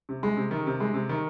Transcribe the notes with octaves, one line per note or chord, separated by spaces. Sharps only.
C3
G#3
C3
D#3
C3
G#3
C3
D#3